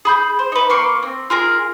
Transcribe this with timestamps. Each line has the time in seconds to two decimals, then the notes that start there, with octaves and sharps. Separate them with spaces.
0.05 G#4 B5 G6
0.39 C5
0.52 D#4 B4
0.70 A#3 C6 C#6
1.02 C4
1.30 F4 G#4 A#4